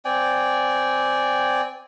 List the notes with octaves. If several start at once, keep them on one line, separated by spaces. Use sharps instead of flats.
C4 D5 G5 G#5